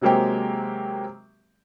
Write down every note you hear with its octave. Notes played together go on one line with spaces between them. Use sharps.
C3 F#3 G#3 A#3 C4 G4